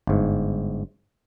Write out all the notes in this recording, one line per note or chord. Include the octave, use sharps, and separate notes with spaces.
G1 G#2